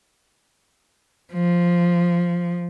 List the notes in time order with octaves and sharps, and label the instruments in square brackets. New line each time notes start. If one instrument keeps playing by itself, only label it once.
[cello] F3